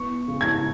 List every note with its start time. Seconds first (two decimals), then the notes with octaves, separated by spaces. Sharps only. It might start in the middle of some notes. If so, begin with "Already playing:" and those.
Already playing: B3 C#6
0.28 C#3
0.41 G#6